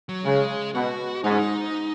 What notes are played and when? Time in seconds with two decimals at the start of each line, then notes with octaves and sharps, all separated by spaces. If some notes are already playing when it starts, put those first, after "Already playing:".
0.09 F#3
0.25 C#3 G#3
0.74 B2 F#4
1.23 G#2 D#4
1.31 C#4
1.39 D#4